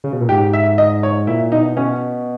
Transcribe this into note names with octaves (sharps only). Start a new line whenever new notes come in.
C#3
B2
A#2
G#2 G4
E5
D#5
C#5
A#2 E4
B2 D#4
B2 C#4